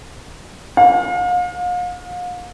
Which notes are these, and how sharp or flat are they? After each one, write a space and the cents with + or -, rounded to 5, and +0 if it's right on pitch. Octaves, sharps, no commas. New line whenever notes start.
F5 +40